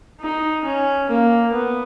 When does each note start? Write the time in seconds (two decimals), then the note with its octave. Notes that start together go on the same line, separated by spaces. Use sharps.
0.21 D#4
0.65 C#4
1.09 A#3
1.52 B3